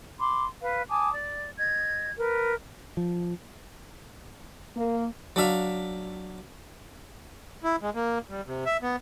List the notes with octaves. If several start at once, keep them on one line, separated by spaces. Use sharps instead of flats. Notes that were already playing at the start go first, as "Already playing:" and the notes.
B5 C6 D6
B4 F5
G#5 A5 D6 D#6
D5
D#5 G#6
A#4 B4
F3
A#3
F#3 D4 E5 F5
E4
G#3
A#3
G3
C3
E5
B3